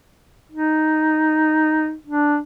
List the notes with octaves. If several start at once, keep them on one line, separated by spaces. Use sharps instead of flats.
D#4
D4